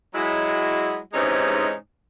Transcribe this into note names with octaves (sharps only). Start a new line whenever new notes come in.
F#3 G#3 E4
G#2 C3 E3 G#3 C#4 D#4